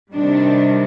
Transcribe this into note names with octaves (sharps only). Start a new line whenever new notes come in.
C3 D#3 G3 D4